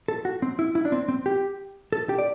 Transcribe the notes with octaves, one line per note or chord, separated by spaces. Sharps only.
A4
F#4
C4
E4
E4
D4
C4
C4
G4
A4
G4
D5